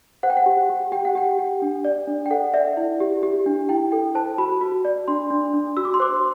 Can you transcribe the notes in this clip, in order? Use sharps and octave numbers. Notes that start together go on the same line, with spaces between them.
C5 F#5
G5
F#5
G4
G4
G4 G5
F#5
G4 G5
G4
D4
D5
D4
G5
A4 F#5
D5 E5
E4
G4
G4
D4
E4 G5
A4 G5
C5 A5
F#4 B5
F#4
D5
D4 C6
D4
D4
F#4 E6
D6
C6
C5 D6